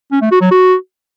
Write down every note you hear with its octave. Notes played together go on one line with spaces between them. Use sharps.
C#4
A3
F#4
F#3
F#4